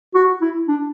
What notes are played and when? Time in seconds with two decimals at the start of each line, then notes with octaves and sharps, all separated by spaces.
0.15 F#4
0.41 E4
0.68 D4